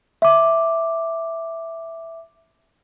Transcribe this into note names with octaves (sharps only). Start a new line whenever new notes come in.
E5 D6